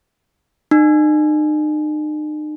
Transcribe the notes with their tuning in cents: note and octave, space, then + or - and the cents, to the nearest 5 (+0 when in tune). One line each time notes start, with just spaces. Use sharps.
D#4 -40